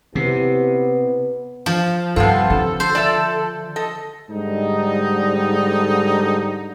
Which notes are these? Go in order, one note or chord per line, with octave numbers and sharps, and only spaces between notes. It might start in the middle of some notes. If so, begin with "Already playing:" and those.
C3 B3 C#4 E4 G4
F3
G2 C3 B3 F4 A4
D3 A4
C5
D5 E5 A5
A4 D#5
G#2 D3 G3 D#4